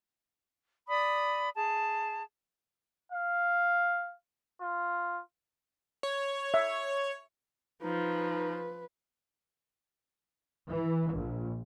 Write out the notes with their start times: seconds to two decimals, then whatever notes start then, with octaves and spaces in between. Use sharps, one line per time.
0.89 D5 B5 D#6
1.55 G#4 A5
3.12 F5
4.61 F4
6.03 C#5
6.54 E5
7.83 F3 D#4 B4
10.69 E3
11.13 A#1